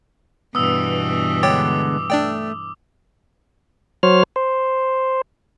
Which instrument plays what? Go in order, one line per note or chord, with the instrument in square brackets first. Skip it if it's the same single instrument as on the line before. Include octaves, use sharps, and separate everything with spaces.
[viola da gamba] G2 B2 E3 [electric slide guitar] B3 [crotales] D#6 E6
[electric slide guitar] D3 G#3 B3 [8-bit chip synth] C#5 G5 A6 [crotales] D6
[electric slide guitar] A3 [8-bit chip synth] D4 D5 G5
[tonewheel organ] F#3 C5 C#5 F6
C5